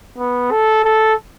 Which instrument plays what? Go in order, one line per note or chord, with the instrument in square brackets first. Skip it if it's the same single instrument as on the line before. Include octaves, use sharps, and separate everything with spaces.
[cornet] B3
A4
A4